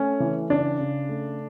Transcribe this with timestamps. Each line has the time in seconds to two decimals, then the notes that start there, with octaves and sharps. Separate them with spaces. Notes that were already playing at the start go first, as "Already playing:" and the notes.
Already playing: A3 C#4
0.20 E3
0.49 C#3 D4
0.80 C#3
1.09 A3